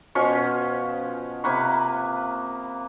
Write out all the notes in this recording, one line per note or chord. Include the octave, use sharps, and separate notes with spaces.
B2 F3 C#4 C#6
C3 A#3 B4 C#6